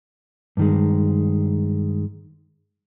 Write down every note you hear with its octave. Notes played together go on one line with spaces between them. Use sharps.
G2 D#3 G#3